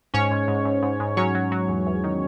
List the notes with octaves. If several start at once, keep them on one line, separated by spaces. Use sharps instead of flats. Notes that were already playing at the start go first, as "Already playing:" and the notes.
G#2 C#4 C#5
G#2
G#2
G#2
G#2
G#2
F#3 C#4 C#5
F#3
F#3
E2
E2
D#3